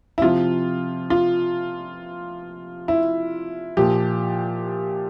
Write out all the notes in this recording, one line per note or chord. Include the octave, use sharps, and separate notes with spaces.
E4
C3 F3 F4
F4
E4
A#2 F3 G4